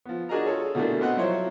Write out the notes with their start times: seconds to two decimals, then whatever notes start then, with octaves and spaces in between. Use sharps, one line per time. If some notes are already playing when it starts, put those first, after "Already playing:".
0.06 F3 B3
0.29 D4 F#4 G#4 A#4 D#5 A#5
0.46 F4 G#4 A4 C#5
0.75 B2 D3 E3 A3 A#3 D4
1.01 B3 C4 D#5 F#5
1.17 F3 F#3 E4 F4 C5 C#5